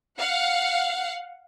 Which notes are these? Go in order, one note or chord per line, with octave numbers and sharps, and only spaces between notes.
F5 F#5